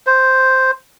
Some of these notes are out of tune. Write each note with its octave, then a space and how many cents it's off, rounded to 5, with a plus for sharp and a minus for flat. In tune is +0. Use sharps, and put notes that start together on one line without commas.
C5 +0